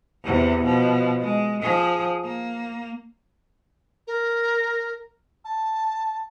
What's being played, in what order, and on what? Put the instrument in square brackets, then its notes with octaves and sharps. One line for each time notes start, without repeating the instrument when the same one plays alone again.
[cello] E2 C3
B2 F3
G#3
F3 G#4
A#3
[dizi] A#4
A5